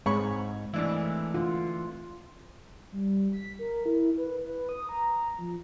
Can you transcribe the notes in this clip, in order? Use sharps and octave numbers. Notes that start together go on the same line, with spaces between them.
G#2 G#3 C4 C#5 B5 C#6
G#1 E3 A3 D4 E4
D3 F4
G3
B6
A#4
E4
B4
B4
D#6
A#5
F3